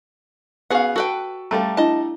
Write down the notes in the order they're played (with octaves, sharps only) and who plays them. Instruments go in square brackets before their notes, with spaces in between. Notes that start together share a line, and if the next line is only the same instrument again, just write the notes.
[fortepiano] B3 F5 [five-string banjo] F#4 G#4 F#5
[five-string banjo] F#4 B4 G5 [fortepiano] A4
[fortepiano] G3 A3 [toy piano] F5 A#5
[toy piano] D4 E4 [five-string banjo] D#5 A5